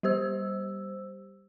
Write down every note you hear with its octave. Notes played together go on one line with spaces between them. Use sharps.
G3 G4 C5 E6